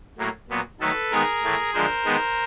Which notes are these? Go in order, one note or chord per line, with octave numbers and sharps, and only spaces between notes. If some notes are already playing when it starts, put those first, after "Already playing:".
A2 F#3 A#3
A#2 F#3 B3
D#3 F#3 A3 A4 B4
D#3 G#3 B3 G#4 A#4
A2 E3 A3
D3 F3 G#3 A#4 C5
D#3 G#3 B3